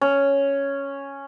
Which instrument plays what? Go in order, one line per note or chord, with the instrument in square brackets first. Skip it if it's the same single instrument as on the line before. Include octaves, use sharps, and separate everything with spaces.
[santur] C#4